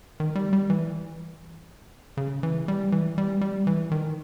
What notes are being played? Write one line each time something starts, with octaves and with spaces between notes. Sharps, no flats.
D#3
G3
G3
E3
C#3
E3
G3
E3
G3
G3
E3
D#3